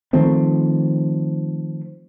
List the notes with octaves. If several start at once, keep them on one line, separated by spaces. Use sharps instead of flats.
D#3 F3 A3 C4